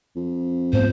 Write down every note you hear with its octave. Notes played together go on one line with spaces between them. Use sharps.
F2
G#2 A3 B3 C5